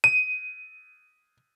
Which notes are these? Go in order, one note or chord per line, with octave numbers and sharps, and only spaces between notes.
D#7